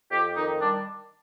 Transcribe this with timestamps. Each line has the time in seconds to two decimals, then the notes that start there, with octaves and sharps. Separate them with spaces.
0.11 F2 G4
0.35 D#3 D#4
0.59 G3 D4